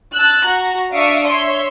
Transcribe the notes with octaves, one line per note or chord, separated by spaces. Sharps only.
A5 E6 F#6
F#4 A#5
D4 E5 F5 C#6 D#6 D7
C#5 E5 C6